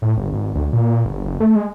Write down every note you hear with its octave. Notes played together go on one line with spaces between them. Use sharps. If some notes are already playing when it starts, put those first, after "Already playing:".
A2
G1
G#1
D2
A#2
G1
F#1
A3
G#3